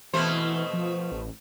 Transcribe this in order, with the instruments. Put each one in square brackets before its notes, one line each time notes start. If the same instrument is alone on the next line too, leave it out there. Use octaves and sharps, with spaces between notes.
[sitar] B2 A3 C5 [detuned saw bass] E3
[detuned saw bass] F3
A1